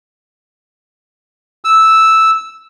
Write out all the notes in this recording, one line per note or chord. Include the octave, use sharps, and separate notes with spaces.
E6